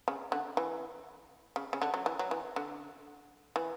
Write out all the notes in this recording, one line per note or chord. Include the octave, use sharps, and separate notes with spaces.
C#3
D3
E3
C#3
C#3
D3
F#3
E3
F#3
E3
D3
E3